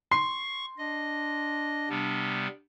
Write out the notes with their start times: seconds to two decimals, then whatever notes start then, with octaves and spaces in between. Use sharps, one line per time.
0.11 C6 C#6 C7
0.78 D4 D#5
1.90 C3 G3 B3